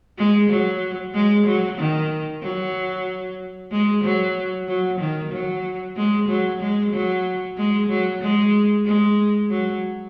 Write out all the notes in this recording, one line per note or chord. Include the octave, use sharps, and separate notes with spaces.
G#3
F#3
G#3
F#3
D#3
F#3
G#3
F#3
F#3
D#3
F#3
G#3
F#3
G#3
F#3
G#3
F#3
G#3
G#3
F#3